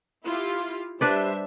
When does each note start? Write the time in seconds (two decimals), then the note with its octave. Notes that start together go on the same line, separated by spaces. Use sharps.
0.25 E4 F4 G4
1.01 G3 D4 B4 C5 D5 E5